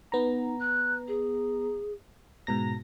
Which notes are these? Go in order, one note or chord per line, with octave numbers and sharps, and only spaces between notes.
B3 D#4 A#5
F#6
G#4
G#2 B2 A#5 A#6